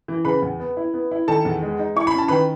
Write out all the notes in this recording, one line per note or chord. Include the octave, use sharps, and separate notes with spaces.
E3
C#3 B4 B5
E2
B3
E4
B3
E4
D#3 A4 A5
E2
G#3
D#4
E4 C#6
B5
C#4 A5
D#3 B4 B5